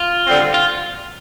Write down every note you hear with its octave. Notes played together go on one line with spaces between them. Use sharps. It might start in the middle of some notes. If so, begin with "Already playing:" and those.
Already playing: F4
D3 G3 C4
F4